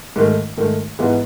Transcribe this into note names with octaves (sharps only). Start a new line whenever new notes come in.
G#2 D#3 A3
G#2 D#3 A3
G#2 E3 G#3 B3 D#4